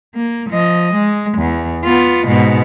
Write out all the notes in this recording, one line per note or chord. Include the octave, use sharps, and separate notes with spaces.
A#3
F3 D#5
G#3
E2
B3 F4
G#2 B2